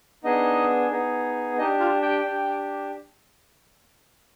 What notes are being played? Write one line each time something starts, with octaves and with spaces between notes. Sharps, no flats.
B3 D4 D#4 G#4 D#5
B3 D#4 G#4
D4 D#4 G4 D#5
F4 F5
G4 G5
D4 G4